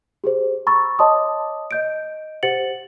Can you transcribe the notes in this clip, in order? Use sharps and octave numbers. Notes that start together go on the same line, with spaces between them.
G4 G#4 C5
A#5 B5 C#6 E6 A6
C#5 D#5 A5 C6 D6 D#6
D#5 G6 D7
G4 C5 F#5 A6 C#7 F#7